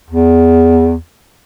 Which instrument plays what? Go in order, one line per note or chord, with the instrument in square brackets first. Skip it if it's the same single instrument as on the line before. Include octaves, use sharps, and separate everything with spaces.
[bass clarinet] E2